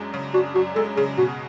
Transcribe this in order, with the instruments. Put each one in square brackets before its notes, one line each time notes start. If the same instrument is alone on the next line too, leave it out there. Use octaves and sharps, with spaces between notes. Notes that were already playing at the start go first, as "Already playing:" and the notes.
Already playing: [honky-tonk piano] F#2 G#3 D4
C#3
[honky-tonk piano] D4 [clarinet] F#4
[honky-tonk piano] F#2 [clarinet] F#4
[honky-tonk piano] G#3 [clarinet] A4
[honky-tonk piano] C#3 [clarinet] G#4
[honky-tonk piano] B2 [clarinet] F#4